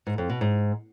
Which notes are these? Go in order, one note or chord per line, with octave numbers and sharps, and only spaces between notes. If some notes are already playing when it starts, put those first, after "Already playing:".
G#2
F2
B2
G#2